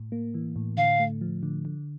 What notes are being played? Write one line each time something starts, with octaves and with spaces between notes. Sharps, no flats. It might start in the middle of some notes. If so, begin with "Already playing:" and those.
Already playing: A2
A#3
E3
A2
D3 F5
A3
F3
D3
D3